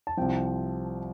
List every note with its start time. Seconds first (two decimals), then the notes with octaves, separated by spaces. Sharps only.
0.07 A5
0.17 C2 C3 F3 G5